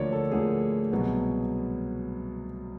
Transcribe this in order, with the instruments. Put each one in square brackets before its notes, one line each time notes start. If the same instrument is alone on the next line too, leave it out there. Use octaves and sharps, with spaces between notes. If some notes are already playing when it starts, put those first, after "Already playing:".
Already playing: [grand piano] D2 D3 F3 A#3 C#5 D5
A4
D2 D3 F3 A#3 G#4
C2 B2 F#3 B3